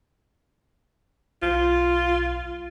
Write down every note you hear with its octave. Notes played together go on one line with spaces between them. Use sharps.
B1 F4